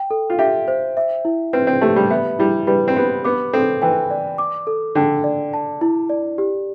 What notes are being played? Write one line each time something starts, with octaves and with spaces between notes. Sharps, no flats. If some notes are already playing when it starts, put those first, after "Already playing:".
Already playing: G5
A4
F4
G4 E5
C5
E5
E4
C4 B4
C4
A3 G4
G3
B3 E5
G3 E4
G3 B4
C4
B3 G4
B3 D6
C4 A4
E3 G5
D5
D6
A4
D3 G5
D5
A5
E4
D5
G4